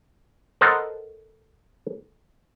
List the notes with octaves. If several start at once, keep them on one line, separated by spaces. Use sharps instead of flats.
B3 A4 A#4 C5 D#5 F#5